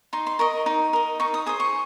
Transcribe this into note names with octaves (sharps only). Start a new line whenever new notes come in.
D#4 C6
C6
A#4 D#5 C#6
D#4
A#4 D#5
D#4 C#6
D#6
G#4 C5 D#6
C#6